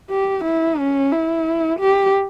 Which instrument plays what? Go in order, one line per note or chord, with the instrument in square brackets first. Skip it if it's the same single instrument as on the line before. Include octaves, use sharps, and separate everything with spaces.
[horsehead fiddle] G4
E4
C#4
E4
G4